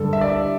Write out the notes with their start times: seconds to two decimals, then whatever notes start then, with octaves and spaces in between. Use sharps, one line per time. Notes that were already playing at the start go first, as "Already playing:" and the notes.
Already playing: G2 D3 G3 A4
0.13 E5
0.21 D5
0.30 E5